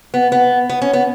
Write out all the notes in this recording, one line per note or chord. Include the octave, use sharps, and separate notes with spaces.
B3
B3
B3
C#4
B3